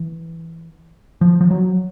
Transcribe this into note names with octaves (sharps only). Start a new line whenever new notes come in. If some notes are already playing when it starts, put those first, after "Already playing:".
Already playing: E3
F3
F3
F#3